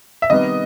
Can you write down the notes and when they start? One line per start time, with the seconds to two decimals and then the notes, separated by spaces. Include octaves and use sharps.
0.22 E5
0.29 C3 D#3 G3 B3 D#5